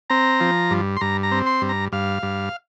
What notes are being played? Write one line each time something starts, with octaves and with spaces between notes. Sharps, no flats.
C4 A#5
F3
G2
C6
G2 A#5
A#5
C4
C6
G2
A#5
G2 F5
G2